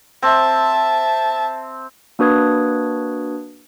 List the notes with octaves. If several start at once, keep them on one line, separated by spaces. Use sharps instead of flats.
C4 E5 A5
A#3 D4 F#4 B4 D#6 G#6